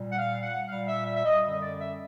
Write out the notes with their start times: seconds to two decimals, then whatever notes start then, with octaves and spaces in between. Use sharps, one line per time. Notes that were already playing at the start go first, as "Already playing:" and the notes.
Already playing: A#2 G3
0.12 F#5
0.18 F5
0.43 F#5
0.68 A#2 G3 F5
0.88 E5
1.06 E5
1.16 E5
1.25 D#5
1.43 F#2 D3 G3 D#5
1.62 D5
1.80 E5